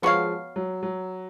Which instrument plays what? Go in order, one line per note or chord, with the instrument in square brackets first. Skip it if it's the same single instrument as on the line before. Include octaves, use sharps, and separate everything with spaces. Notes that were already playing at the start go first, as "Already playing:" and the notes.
[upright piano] F3 G#3 [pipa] B3 F#4 C#5 F5
[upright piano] F#3
F#3